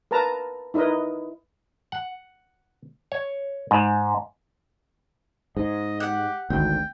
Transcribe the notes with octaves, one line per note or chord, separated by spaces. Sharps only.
A#4 B4 A5 A#5
D#4 E4 A#4 B4 D#5
F#5
C#5
G#2
G#2 D#5
G4 F#5
G#1 D2 G5